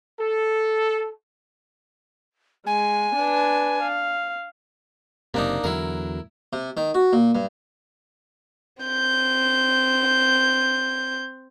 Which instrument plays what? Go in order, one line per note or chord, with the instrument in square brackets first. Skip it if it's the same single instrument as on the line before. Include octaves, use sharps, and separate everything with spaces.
[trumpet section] A4
[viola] G#3 [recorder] G#5
[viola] D4 B4
F5
[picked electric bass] F#1 C3 [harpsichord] A#3 D4 D#4
[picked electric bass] E2 D3 F#3 [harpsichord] E4 A#4
[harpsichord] C3
D#3
F#4
A#2
G2
[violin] C4 G6